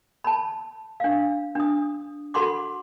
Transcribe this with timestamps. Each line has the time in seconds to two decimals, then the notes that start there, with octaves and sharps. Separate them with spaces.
0.24 A5 B5
1.00 D4 F5
1.55 D4 D#6
2.34 F#4 A4 F#5 B5 C6 D6